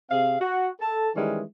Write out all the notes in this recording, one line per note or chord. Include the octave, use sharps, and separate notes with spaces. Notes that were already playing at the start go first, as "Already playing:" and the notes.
C3 C4 G#4 F5
F#4
A4 A5
D#3 E3 G3 G#3 C#4